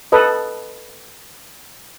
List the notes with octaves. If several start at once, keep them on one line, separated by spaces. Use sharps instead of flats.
A4 B4 D#5